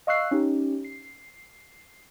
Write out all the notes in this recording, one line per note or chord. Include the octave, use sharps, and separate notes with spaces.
D#5 F5 C#6 E6 F#6 C7
C#4 D#4 G4
C7